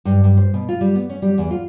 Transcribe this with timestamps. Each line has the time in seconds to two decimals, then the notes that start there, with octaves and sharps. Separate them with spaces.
0.05 G2
0.24 G2
0.37 C5
0.54 B2
0.69 F4
0.81 G3
0.95 B3
1.09 C#4
1.22 G3
1.38 E2
1.51 F4